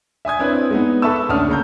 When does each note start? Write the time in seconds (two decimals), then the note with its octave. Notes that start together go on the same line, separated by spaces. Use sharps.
0.25 E5 G#5 D#6 G#6
0.39 C4 D4 E4 B4 C#5
0.70 G#3 B3 D#4
1.02 A4 B4 E5 A5 C#6 E6
1.29 D2 A3 C#4 D4 D#6 F6
1.48 C#3 A#3 A#5 G6